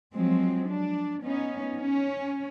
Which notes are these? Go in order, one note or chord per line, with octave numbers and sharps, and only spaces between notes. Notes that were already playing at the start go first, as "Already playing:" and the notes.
F3 F#3 G#3 C4
D4
B3 C#4 D#4
C#4